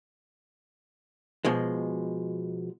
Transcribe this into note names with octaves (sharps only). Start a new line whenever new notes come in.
B2 F3 G#3